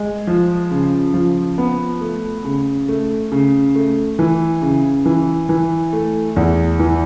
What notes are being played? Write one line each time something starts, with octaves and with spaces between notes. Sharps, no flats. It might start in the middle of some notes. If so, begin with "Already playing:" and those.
Already playing: G#3
F3
C#3
F3
B3
A3
C#3
A3
C#3
A3
E3
C#3
E3
E3
A3
E2
E3